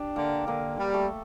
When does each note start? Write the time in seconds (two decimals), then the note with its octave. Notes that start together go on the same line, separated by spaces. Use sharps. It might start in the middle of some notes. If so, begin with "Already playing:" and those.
Already playing: D4 G4
0.16 D3 A#3 A#4
0.47 D3 A#3 A#4
0.78 G3
0.94 A3 A4